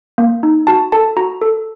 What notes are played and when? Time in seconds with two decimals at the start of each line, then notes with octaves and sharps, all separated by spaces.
0.18 A#3
0.43 D#4
0.67 F#4 A5
0.92 A4 A5
1.17 F#4 A#5
1.42 A4